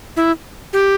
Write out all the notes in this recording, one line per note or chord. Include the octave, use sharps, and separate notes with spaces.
E4
G4